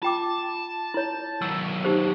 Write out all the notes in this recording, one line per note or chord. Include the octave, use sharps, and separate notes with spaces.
F4 G5 A5 D6
E4 C#5
D#3 F#3 E6
D#4 G4 C5